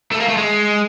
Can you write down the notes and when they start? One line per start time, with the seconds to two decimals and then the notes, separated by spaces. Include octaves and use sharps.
0.11 A3
0.20 A#3
0.28 A3
0.37 G#3